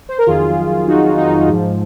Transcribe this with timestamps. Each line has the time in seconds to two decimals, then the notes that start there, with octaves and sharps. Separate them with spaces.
0.09 C5
0.18 A#4
0.26 F2 D#3 F#3 F4 G#4
0.87 D#4 F#4
1.18 D#4
1.48 G#2 F3